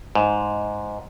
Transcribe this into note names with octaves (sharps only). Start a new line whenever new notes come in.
G#2